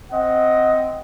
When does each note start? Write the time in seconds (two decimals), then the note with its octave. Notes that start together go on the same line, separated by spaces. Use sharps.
0.11 C4 D#5 F#5